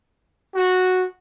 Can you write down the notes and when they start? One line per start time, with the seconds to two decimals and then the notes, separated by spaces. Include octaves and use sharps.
0.55 F#4